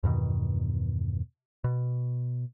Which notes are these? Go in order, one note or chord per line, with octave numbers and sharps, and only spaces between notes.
E2 G2 B2 D#3
B2